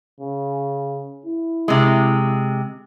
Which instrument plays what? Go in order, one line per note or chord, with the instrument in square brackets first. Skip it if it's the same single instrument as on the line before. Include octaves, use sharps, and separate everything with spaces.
[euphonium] C#3
E4
[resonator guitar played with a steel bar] C3 G#3